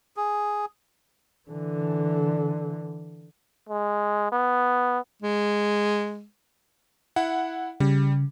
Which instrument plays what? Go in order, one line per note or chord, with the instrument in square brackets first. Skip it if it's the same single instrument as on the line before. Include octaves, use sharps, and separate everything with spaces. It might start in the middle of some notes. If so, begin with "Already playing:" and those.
[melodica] G#4
[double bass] D3 E3
[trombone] G#3
B3
[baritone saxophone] G#3
[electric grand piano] E4 F#5
[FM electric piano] C#3 [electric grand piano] G3